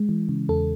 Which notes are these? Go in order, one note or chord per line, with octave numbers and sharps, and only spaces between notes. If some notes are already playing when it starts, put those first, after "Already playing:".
Already playing: G#3
E3
C#3
E2 A4